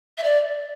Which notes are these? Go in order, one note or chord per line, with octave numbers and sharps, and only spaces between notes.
E5
D5